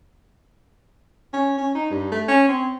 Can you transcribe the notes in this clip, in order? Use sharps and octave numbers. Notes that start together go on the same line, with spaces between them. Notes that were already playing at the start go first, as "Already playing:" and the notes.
C#4
C#4
D#4
G2
A3
C#4
C4